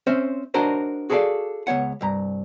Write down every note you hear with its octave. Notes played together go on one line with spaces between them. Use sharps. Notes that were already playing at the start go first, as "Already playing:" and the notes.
C4 C#4 C5 E5
D4 D#4 F#4 A#4 C5 C#5
F#4 G#4 A4 B4 D5 F5
C#2 B3 C#5 F#5
C2 G2 A#5